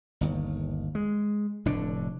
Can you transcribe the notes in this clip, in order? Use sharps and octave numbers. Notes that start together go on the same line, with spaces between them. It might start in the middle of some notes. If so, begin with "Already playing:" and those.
G1 D#2
G#3
F1 A2 D3 D4